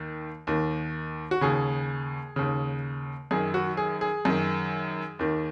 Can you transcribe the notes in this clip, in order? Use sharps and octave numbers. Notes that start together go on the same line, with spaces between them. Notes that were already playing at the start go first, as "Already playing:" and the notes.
Already playing: D#2 D#3
D#2 D#3
F#4
D#2 C#3 G#4
D#2 C#3
F#2 D#3 G#4
F#4
G#4
G#4
F#2 D#3
D#2 D#3